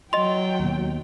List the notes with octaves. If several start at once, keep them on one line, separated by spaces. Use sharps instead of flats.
F#3 D#5 G5 C6
D#2 B2